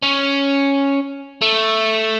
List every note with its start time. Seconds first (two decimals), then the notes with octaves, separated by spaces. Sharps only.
0.03 C#4
1.41 A3